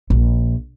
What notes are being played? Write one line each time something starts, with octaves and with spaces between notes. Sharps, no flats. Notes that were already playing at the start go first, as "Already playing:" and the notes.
A#1